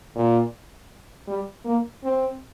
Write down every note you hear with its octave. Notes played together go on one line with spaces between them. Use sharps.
A#2
G3
A#3
C4